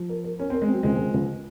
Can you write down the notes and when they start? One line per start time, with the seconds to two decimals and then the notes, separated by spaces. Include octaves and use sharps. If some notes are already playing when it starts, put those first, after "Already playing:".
Already playing: F3
0.09 A#4
0.24 A#4
0.39 C#4 A#4
0.50 C4
0.54 A#4
0.62 G#3
0.68 F#3 C4
0.83 C#2 G#3
0.98 C#2
1.14 C#2